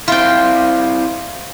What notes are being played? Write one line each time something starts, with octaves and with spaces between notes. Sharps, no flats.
C4 E4 F4 G5